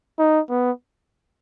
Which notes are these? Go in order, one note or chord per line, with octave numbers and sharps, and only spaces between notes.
D#4
B3